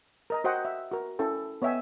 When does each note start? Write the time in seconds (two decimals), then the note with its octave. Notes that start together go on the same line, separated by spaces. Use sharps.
0.30 A#4 D#5 A#5
0.44 F#4 C5 D#5 F#5 G5
0.65 E5
0.92 F#4 A#4
1.19 C#4 E4 A4 G5
1.62 B3 C#5 D#5 E5 G5 G#5